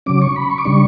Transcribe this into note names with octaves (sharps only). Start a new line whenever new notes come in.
C#3 F#3 C#4 D6
C#6
B5
C#6
D6
C#3 G3 D4 C#6